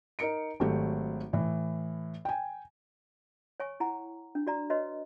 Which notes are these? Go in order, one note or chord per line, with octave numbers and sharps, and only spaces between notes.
D#4 A#4 C#7 D7
G#1 F#3 A3 G4 A4
A2 E3
G5 G#5
C#5 G#5 C#6
E4 F#5 G#5 A#5
D4
F#4 D5 A#5
F#4 B4 C#5 D#5 C6